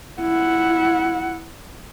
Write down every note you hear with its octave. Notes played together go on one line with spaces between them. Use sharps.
E4 F#5